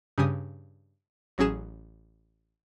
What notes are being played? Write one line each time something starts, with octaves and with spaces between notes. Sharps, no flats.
G2 C#3 G3 G#5 D#6
A1 F#3 C#4 G#4 E7